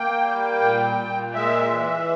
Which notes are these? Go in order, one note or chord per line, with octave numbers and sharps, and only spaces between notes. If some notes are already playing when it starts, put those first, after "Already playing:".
Already playing: A#3 G5
G3
A#2
A#2
G#3 E5
E3